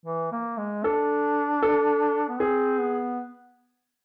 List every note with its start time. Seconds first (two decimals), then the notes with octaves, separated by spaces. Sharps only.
0.05 E3
0.32 A#3
0.58 G#3
0.84 D4 A4
1.63 A4
2.28 B3
2.40 C4 G#4
2.80 B3